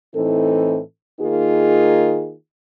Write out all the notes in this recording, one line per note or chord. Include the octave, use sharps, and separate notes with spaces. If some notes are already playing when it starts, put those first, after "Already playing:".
A2 E3 C4 D#4 A4
D#3 A#3 D#4 F4 G#4